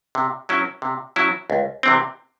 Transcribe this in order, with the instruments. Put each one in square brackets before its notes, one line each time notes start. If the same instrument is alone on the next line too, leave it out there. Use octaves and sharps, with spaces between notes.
[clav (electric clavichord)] C3
F#3 C#4 E4
C3
F#3 C#4 E4
C#2
C3 E3 C4